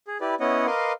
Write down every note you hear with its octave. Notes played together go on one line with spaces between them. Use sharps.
G#4
E4 G4 B4 D5
B3 C#4 E4 C#5 D#5 F#5
A#4 B4 D#5 F5 C6 D6